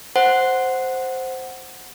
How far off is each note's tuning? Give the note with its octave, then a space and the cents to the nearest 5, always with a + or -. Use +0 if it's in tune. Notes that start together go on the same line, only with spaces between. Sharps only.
C5 +0 F#5 +0